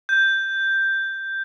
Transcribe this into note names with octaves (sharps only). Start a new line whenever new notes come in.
G6